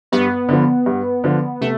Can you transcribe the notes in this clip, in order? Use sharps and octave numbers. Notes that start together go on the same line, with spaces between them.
G2 B3
D3 F3
G2
D3 F3
C3 A3